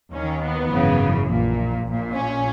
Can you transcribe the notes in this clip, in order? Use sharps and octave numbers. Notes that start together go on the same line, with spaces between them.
D#2 D#3 C#4
B3
G#1 F#2 C#3 E3
A#1 A#2
A#1 A#2
C#4